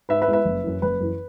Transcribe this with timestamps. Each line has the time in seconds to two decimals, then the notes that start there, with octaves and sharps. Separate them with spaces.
0.09 G#2 B4 E5
0.21 B4 E5
0.28 G#3 B3 E4
0.33 B4 E5
0.45 F#1
0.64 F#2 E3
0.82 F#1 B4
1.00 F#2 E3